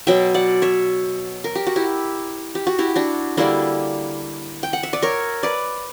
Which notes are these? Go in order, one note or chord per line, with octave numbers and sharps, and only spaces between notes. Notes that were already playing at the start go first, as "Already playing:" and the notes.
B2 F#3 B3 E5 G5
D5 F#5
C#5 E5
A#4
G4
F#4
E4 G4
G4
F#4
E4 G4
D4 F#4
D3 G3 A#3 D4 E4
G5
F#5
E5
D5
A#4 C#5
B4 D5